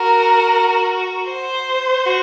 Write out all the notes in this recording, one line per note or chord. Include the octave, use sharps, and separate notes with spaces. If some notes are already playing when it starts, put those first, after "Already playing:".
Already playing: F#4 A#4
C5
F#4